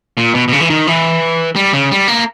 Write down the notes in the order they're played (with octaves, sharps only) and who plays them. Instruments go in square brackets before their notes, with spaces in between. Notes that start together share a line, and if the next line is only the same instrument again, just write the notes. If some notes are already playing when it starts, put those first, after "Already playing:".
[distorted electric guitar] A#2
B2
B2
C#3
E3
D#3
E3
G3
C#3
G3
A#3